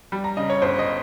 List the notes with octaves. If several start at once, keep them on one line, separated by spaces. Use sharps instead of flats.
G3
A#5
C#3 D#5
C#5
G1 C5
D#5